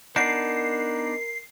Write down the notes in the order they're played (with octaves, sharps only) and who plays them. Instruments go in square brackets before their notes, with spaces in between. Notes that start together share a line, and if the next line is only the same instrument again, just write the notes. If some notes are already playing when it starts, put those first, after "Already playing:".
[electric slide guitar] B3 D4 D#4 [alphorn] A#4 [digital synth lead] C7